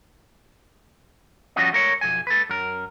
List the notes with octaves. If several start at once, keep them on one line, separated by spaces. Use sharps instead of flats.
F3 G3 C#4 F#4 D#5
A3 A#4 C#5
B1 F2 G#5
A4 B4
F#2 A#4